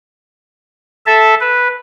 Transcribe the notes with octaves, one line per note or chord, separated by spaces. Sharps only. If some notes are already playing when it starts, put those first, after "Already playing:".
A4 E5 A5
B4